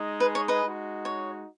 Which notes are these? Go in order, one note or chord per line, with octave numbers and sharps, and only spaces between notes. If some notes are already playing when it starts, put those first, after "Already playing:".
Already playing: G#3 D#4 G#4
B4
C#5
B4 D#5
G#3 D#4 F#4
C#5